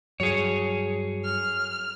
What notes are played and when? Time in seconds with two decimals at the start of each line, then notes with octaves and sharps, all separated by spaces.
0.20 G2 F#3 G#4 C#5
1.24 F6